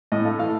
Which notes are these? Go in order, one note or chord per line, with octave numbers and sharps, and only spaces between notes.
A2 D#5
A3 F5
E3 F5